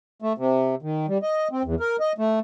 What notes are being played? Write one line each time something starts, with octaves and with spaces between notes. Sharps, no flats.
A3
C3
D#3
G3
D#5
C4
E2
A#4
D#5
A3